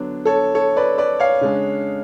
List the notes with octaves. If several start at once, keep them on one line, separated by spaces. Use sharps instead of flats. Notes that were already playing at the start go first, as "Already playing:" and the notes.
Already playing: D3 F#3 B3 D4
A4 C#5
A4 C#5
B4 D5
B4 D5
C#5 F5
C#3 G#3 D4